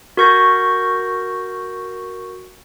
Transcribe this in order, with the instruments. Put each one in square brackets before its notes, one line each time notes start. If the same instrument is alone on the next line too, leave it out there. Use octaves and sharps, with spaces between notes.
[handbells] F#4 A#4 C#6 G6 A#6